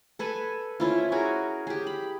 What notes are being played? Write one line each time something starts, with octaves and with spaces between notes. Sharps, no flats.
A4 B4 G#5 B5
C#4 E4 F4
C#4 F#4 G#4 A#4
G4 G#4
B5